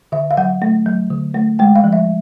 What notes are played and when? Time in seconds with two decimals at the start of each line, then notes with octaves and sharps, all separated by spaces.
0.12 D3 E5
0.31 F5
0.37 F#3 F#5
0.62 A3
0.86 F#3
1.10 D3
1.35 A3
1.59 G#3 G5
1.76 F5
1.84 F3
1.93 E5